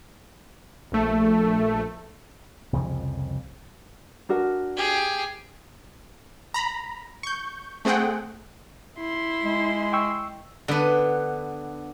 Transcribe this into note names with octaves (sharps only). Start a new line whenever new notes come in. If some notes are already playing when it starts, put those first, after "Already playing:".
A#1 A3
C2 F2 C#3 F3
D4 F#4 A#4
G4 G#4
A#5 B5
C#6 G6
A3 C4 G#4 F#5 G5
E4 C6
G#3
G5 C#6 E6
D3 B3 B4